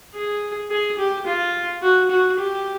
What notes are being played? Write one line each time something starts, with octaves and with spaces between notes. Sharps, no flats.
G#4
G#4
G4
F4
F#4
F#4
G4